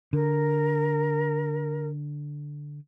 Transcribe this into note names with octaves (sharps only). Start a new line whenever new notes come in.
D3 A#4